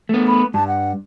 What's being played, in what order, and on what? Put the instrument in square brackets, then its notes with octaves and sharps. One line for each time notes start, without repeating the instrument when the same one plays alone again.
[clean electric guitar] A3 B3
[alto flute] B5
[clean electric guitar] G2 [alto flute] A5
[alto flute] F#5